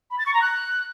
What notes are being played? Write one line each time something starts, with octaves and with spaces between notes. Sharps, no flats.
B5
A6
C#6
A#5
F#6